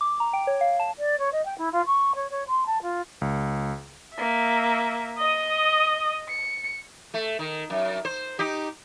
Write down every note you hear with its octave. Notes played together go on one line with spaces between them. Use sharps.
D6
A#5
G5
C#5
F5
A5
D5
C#5
D#5
G5
E4
F4
C#6
C#5
C#5
C6
A5
F4
C#2
A#3 E5
D#5 D#6
C#7
A3
D#3
F#2
C5
D#4 G4